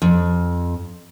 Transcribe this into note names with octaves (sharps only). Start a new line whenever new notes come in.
F2